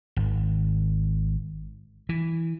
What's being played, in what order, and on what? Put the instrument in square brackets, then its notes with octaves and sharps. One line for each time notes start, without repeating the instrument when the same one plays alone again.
[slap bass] G#1
E3